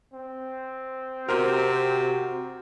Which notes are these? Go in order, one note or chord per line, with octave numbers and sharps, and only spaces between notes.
C4
C3 F#4 A#4 C5